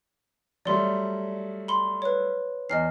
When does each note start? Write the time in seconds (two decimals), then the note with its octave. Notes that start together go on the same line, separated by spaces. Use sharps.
0.65 F#3 G3 A3 D5 C6
1.68 B5 C6
2.02 B4 C#5
2.70 E2 D#5 F6 C7